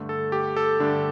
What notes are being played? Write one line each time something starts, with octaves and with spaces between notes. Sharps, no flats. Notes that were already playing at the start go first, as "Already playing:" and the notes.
Already playing: G2 D3 A3
A4
G4
A4
G2 D3 A3 D4